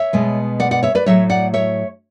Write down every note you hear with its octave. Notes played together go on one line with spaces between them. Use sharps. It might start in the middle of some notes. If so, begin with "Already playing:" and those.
Already playing: C#5 E5
B2 G#3 B3
D5 F#5
D5 F#5
C#5 E5
B4 D5
A2 F#3 A3 C#5 E5
D5 F#5
C#5 E5